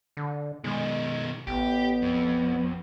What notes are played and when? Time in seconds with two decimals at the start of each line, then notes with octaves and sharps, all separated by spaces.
0.17 D3
0.64 B2 D#3 G#3
1.47 A1 B3 G4
2.02 F2